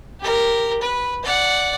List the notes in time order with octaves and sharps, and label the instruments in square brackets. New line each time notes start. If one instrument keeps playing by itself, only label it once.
[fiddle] G4 A#4
B4
D5 F#5